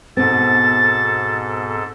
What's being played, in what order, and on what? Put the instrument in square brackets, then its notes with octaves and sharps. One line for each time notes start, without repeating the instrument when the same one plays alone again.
[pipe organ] G#2 A4 [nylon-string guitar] B2 C4 [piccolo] A6